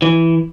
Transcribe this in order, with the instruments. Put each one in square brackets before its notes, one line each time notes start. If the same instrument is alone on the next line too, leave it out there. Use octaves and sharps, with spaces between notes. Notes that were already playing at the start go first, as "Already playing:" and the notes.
[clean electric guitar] E3